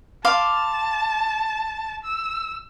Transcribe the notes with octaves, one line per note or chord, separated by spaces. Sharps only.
F5 A5 C6 D6
E6